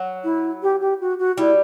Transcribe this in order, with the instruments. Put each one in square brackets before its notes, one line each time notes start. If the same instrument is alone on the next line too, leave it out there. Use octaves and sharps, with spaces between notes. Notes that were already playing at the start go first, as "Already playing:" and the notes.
Already playing: [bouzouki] F#3
[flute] E4
G4
G4
F#4
F#4
[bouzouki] G3 [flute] E4